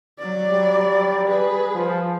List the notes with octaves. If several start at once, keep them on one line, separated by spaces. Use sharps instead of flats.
F#3 D5
G3
G#4 B4
F3